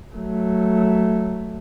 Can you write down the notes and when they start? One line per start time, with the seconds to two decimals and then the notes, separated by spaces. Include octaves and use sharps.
0.14 F#3 A3